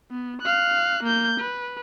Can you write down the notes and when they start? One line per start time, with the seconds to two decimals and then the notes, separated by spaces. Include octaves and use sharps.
0.11 B3
0.42 F5 F#6
1.03 A#3 G6
1.40 B4